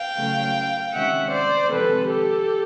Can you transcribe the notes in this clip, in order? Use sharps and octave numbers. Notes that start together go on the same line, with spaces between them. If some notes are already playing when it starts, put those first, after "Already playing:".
Already playing: F5 G5
C#3 F#3 A3
C3 D#3 G#3 C#4 E5 F#5
C5 D5
F2 C3 D#3 G#3 C4 A4 B4
G4 A4